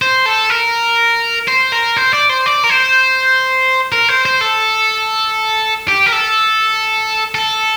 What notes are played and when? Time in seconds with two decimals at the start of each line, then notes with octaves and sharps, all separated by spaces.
0.02 C5
0.26 A4
0.50 A#4
1.48 C5
1.72 A#4
1.97 C5
2.13 D5
2.29 C5
2.46 D5
2.64 A#4
2.70 C5
3.92 A#4
4.09 C5
4.25 C5
4.41 A4
5.88 G4
6.06 A#4
6.13 A4
7.35 A4